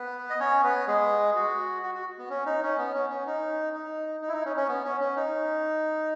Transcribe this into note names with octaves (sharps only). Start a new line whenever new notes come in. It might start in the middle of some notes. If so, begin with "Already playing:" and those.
Already playing: B3 B4
D#5
C#4 C#5
B3 B4
G#3 G#4
F#4
F#4
F#4
B3
C#4
D#4
C#4
B3
C#4
C#4
D#4
D#4
D#4
E4
D#4
C#4
C#4
B3
C#4
C#4
D#4